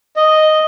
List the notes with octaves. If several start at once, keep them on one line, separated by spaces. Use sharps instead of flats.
D#5